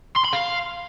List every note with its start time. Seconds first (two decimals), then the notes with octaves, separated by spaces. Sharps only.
0.16 C6
0.25 B5
0.33 F5